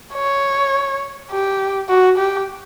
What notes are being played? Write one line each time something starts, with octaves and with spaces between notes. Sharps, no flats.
C#5
G4
F#4
G4